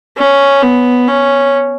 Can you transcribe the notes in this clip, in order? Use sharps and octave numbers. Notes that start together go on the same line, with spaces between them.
C#4
B3
C#4